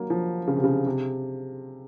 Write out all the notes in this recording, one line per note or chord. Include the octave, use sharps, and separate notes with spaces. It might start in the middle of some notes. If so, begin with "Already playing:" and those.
Already playing: F#3 A#3
F3
C#3
C3
C#3
C3